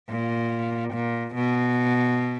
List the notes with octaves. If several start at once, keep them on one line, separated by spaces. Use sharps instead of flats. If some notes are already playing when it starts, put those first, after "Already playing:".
A#2
A#2
B2